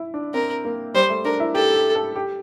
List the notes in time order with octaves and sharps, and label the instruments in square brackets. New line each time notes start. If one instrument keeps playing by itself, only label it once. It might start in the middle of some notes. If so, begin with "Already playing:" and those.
Already playing: [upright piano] E4
D4
[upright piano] C4 [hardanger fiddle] A#4
[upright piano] A#3
[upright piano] G3 [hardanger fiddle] C5
[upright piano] A3
[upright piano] D4 [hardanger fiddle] A#4
[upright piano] E4
[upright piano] G4 [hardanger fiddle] A4
[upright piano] G4
A4
G4